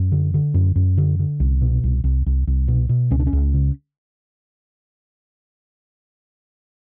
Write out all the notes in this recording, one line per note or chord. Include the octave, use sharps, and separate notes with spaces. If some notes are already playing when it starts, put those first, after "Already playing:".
Already playing: F#2
D3
D3
F#2
F#2
D3
D3
C2
B2
C2
C2
C2
C2
B2
B2
C#2 C#4
D4
C#4
C#2
C#3